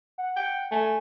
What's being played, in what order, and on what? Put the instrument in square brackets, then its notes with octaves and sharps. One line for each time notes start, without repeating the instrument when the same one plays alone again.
[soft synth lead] F#5
[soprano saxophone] G5
[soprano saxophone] A3 [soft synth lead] G#5